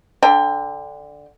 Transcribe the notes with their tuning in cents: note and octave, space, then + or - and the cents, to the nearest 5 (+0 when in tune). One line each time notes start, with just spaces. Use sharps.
D3 +0 G5 +25